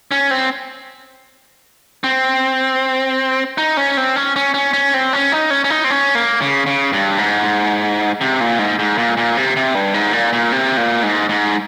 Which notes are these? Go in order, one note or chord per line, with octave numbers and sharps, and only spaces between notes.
C#4
C4
C4
D#4
C#4
C4
C#4
C#4
C#4
C#4
C4
C#4
D#4
C#4
C#4
D#4
C4
C#4
A#3
C#3
C#3
G2
G#2
C3
A#2
G#2
G#2
A#2
A#2
C3
C3
G2
G#2
A#2
A#2
C3
A#2
G#2
G#2